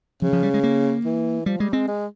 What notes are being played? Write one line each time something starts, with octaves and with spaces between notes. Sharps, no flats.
C#3 F3
F3
G3
G#3
A#3
E3
F3 G3
G3 G#3
G#3 C4
G#3